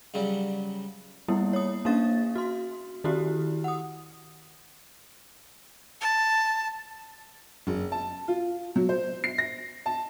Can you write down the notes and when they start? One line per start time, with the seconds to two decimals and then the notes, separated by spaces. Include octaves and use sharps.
0.14 C#3 F#3 G3
1.28 G3 A#3 B3 E4
1.53 C#5 D#6
1.85 A#3 C#4 D4 F5 A6
2.35 F#4 C6
3.04 D#3 E4 F#4 G4
3.64 F#5 D#6
6.01 A5
7.67 F#1
7.92 A5
8.28 F4
8.76 F#3
8.89 C5
9.24 C7
9.38 A#6
9.86 A5